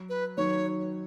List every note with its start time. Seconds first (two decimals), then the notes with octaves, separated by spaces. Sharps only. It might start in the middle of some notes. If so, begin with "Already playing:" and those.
Already playing: F#3
0.09 B4
0.37 D#3 F#3 C#5